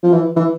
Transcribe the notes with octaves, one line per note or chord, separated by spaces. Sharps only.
F3
E3
E3